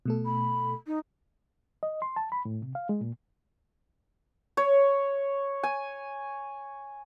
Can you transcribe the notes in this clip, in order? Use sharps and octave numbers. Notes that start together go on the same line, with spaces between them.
B2 A3 A4
B5
D#4
D#5
C6
A5
B5
A2
C3
F5
G#3
A#2
C#5
G#5